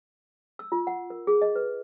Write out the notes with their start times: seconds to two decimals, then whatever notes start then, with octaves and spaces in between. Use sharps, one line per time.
0.59 E6
0.72 F4
0.87 F#5
1.10 A#4
1.27 G#4
1.42 D#5
1.55 B4